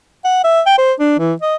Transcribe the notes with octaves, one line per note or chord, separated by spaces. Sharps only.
F#5
E5
G5
C5
D4
E3
D#5